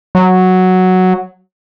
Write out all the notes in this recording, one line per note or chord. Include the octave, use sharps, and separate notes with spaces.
F#3